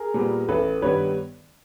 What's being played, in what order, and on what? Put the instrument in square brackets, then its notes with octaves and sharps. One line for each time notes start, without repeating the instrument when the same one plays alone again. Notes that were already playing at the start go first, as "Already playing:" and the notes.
Already playing: [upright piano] G#4 A#4
A#2 G3 B3
A1 A4 B4
G2 D#3 G3 B3 B4 C#5